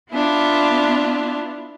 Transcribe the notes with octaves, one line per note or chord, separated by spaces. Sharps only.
B3 D4 E4 F4